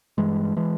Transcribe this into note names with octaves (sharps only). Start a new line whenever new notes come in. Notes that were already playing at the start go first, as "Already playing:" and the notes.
G2 E3 G#3
E3 G#3